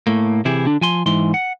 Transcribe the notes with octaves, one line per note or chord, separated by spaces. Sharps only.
A2 A3 A#3
C3 E3 E4 G4 G#4
D3 D4
F3 G#5 C6
G#2 E3 C6
F#5